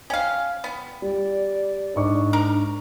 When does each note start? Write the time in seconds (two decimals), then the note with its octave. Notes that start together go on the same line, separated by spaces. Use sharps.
0.10 C#4 F5 G5
0.64 B3
1.02 G3 D5
1.96 G#2 D4 C#6 D6
2.33 A#4